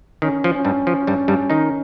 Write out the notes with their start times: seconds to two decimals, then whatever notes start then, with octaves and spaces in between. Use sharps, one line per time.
0.22 D#3 C#4
0.44 F3
0.55 C#4
0.65 G2 G3
0.87 F3
1.07 G2 G3
1.28 G2 G3
1.50 D#3 D#4